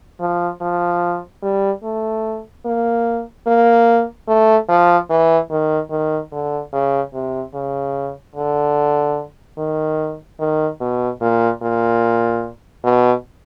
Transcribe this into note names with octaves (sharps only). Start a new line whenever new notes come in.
F3
F3
G3
A3
A#3
A#3
A3
F3
E3
D#3
D#3
D3
C#3
C3
C#3
D3
D#3
D#3
B2
A#2
A#2
B2